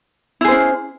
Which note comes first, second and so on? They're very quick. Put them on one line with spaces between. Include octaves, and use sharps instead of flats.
E4 G#4 C5 C#4